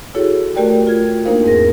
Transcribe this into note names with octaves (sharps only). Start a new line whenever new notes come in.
E4 F#4 G#4 A4 C#5
A3 F#4 G4 A#4 D5 G5
F4 G#6
A#3 D4 D#4 A#4 C5 F5
E2 G#2 C4 G#4 A#4 A#6